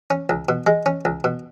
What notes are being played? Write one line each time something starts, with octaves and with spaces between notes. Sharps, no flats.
C#4
C#2
B2
G#3
C#4
C#2
B2